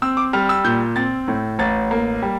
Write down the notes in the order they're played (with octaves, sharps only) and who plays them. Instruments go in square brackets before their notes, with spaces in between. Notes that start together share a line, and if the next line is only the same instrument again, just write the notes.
[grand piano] C4 E6
D6
G3 F6
E6
A#2 G6
C4 A6
A2
A1 A6
A#3
G3